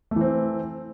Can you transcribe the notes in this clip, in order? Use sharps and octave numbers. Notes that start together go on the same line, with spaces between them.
E3 A3 C4